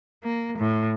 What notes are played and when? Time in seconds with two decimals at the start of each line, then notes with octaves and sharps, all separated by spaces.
0.24 A#3
0.58 A2